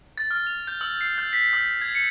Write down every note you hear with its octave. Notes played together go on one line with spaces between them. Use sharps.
A6
F6
F7
G6
E6
C7
G6
B6
E6
G#6
C#7